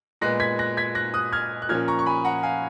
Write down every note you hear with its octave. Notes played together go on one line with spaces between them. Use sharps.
A#2 G#3 B3 F#6 A#6
G#6 B6
F#6 A#6
G#6 B6
F#6 A#6
D#6 F#6
F6 G#6
F#6
A#2 F3 A#3 C#4 F6 G#6
A#5 C#6
C#6
G#5 B5
F#5 A#5
F5 G#5